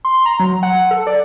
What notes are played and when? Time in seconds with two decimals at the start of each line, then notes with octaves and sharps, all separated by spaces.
0.05 C6
0.26 A#5
0.40 F#3
0.63 F#5
0.91 A4
1.07 D5